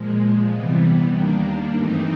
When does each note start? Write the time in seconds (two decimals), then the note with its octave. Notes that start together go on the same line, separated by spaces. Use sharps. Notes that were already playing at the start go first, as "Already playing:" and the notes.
Already playing: A#2 F3 G#3
0.53 C3 E3 G3 B3
1.14 D#2 D#3 G3 A#3 D4
1.76 G2 E3 A3 C4 D#4